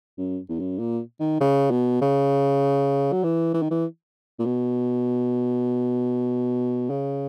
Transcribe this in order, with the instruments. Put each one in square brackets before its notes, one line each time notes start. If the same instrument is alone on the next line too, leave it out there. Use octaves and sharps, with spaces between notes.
[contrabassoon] F#2
E2
F#2
A#2
D#3
C#3
B2
C#3
F#3
E3
E3
D#3
E3
A#2
B2
C#3